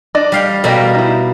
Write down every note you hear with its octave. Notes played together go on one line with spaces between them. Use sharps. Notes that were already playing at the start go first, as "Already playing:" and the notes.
D4 D5 D#5
G3 F5 G5
B2 G3 A#3 A4 D#5 G5
D#4 E4